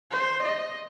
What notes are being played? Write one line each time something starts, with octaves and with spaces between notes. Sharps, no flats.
C5
D#5